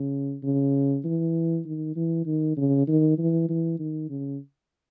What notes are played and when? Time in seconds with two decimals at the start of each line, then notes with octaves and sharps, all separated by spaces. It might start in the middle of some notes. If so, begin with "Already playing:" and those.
Already playing: C#3
0.43 C#3
1.05 E3
1.66 D#3
1.96 E3
2.26 D#3
2.57 C#3
2.88 D#3
3.18 E3
3.49 E3
3.80 D#3
4.10 C#3